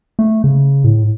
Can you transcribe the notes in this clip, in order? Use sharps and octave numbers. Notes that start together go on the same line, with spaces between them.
A3
C#3
A2